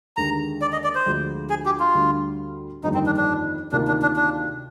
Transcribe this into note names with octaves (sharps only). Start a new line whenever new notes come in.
D#2 D3 G#3 A#5
D5
D#5
D5
C5
D2 D3 F3 G#3
G#4
G4
F4
D2 D3 G3
G1 F2 D#3 G3 A#3 D#4
C4
D4
D4
D2 C3 D#3 A#3 D4 F4
D4
D4
D4